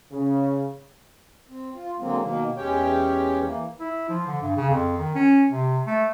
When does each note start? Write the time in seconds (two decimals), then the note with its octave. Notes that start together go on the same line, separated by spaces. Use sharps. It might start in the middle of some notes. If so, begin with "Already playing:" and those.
0.11 C#3
1.49 C4
1.74 F4
2.00 D3 F#3 G#3 A#3 C4
2.21 B2 D#3 A#3
2.56 E2 G#3 C#4 G4 C#5 G5
3.42 E3 A#3
3.79 E4
4.09 F3
4.27 D3
4.42 G2
4.56 C#3
4.70 F2
4.97 D#3
5.15 C#4
5.50 C3
5.86 A3